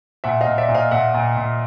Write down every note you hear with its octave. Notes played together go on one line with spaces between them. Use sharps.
A#2 E5 F#5
D#5 F5
A#2
D5 E5
A#2
D#5 F5
A#2 E5 F#5
A#2
A#2